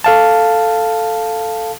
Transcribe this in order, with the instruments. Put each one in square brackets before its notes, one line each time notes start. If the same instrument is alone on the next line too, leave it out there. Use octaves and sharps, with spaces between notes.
[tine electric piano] A4 F5 A5